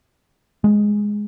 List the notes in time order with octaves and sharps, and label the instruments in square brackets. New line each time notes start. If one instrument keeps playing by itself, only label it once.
[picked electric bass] G#3